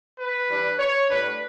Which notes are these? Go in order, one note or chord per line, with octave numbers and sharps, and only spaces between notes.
B4
E3 G3 D4
C#5
A2 G3 D4 B4